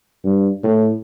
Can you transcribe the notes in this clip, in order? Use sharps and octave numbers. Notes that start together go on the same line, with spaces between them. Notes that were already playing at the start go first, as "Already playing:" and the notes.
G2
A2